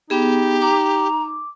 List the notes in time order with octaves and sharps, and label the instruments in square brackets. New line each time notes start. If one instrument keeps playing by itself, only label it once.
[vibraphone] B3 G#4 [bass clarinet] D#4 [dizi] G4
[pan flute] A#5 [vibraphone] D6